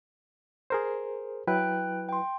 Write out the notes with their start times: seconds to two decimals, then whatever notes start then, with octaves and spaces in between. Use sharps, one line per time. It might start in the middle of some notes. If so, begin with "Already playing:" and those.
0.70 G#4 A#4 C5
1.47 F#3 E4 B4 G5 F#6
2.09 G5 C6